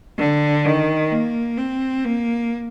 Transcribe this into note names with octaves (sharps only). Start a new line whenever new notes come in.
D3
D#3
A#3
C4
A#3